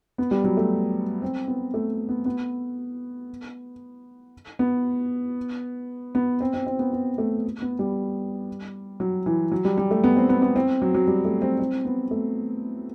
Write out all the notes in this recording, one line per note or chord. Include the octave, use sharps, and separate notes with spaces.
B3
G3
F#3
A3
C4
B3
A3
B3
B3
B3
B3
C4
C4
C4
B3
B3
A3
B3
G3
F#3
E3
F#3
G3
G3
A3
B3
C4
B3
B3
C4
F#3
F#3
G3
A3
C4
C4
B3
A3